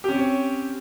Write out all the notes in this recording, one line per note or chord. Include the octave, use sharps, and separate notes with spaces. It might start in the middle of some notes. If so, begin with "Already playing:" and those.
C4 C#4 G4 C#5